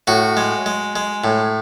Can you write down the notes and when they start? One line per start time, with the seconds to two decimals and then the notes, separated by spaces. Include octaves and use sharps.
0.07 A2 F#4
0.37 G#3
0.66 G#3
0.96 G#3
1.24 A2